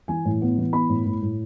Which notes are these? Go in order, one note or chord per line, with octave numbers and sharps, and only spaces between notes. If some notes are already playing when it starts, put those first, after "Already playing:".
E3 G#5
A2
B3
E3
B3 B5
A2
A2
A2